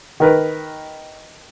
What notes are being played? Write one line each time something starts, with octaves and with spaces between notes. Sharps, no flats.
D#3 A#4 B4